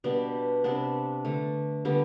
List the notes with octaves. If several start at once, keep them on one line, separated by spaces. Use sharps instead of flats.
B2 G3 B3 D4
C3 G3 B3 D4
D3 A3
D3 G3 B3